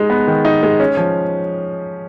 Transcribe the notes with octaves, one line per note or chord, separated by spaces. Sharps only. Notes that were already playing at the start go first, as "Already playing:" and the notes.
Already playing: G#3 D#4
B3
D#3
D#4
G#3
C#4
F3